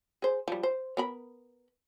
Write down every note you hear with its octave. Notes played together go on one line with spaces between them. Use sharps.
G#4 C5
F3 G3
C5
B3 A#4 B5